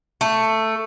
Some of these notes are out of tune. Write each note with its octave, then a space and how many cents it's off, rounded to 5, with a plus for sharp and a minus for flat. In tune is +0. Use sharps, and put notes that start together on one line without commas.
A3 +10